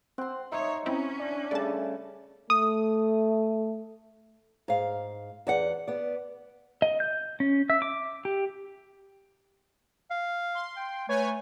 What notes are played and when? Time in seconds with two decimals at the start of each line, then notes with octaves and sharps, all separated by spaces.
0.18 C4 F#5 C6
0.52 D#4 C#5 E5 C6
0.86 C4 C#4 E4
1.19 D4
1.51 C#3 G3 A3 D5 A5
2.50 A3 D#6
4.68 G#2 F5
5.47 E2 D5 F#5
5.88 B3 D5
6.82 D#5
7.00 G6
7.40 C#4
7.70 E5
7.82 D6
8.25 G4
10.11 F5
10.55 C6
10.77 G5
11.09 A3 B4 C#5 G#5